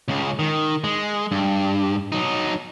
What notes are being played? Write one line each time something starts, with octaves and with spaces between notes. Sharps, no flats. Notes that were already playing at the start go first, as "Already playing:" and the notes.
C#2 C#3
D#3
G#3
G2
F#3 D#4